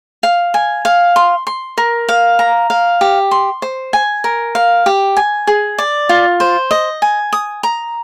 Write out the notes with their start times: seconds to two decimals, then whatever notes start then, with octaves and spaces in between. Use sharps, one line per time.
0.23 F5
0.54 G#5
0.85 F5
1.16 C6
1.47 C6
1.78 A#4
2.09 F5
2.39 A#5
2.70 F5
3.01 G4
3.31 C6
3.62 C5
3.93 G#5
4.24 A#4
4.55 F5
4.86 G4
5.17 G#5
5.47 G#4
5.78 D5
6.09 F4
6.40 C5
6.71 D#5
7.02 G#5
7.33 D#6
7.63 A#5